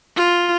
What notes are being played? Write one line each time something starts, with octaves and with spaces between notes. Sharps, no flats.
F4